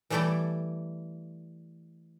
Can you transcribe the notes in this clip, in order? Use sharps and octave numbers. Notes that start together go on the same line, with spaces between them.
E3 G3 A3 E4 A4 D5